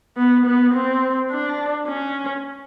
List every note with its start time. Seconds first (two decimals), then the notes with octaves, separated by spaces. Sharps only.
0.17 B3
0.46 B3
0.74 C4
1.31 D4
1.88 C#4